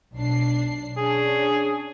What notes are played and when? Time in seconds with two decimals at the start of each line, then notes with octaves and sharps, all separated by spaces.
0.16 B1 D4 C7
0.97 C#4 D4 G#4